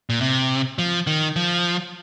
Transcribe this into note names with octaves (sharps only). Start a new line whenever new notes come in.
A#2
C3
F3
D#3
F3